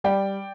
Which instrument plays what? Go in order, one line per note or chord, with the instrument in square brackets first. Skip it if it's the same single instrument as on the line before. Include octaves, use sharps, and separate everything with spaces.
[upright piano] G3 D5 G5